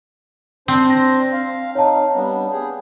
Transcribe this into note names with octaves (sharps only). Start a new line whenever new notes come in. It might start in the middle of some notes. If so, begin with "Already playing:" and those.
C4 D4 C5
A#6
F5
D#4 C#5 F5 A5
G3 B3 D4
G4 G#4